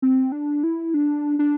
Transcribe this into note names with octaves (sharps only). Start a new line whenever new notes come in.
C4
D4
E4
D4
D4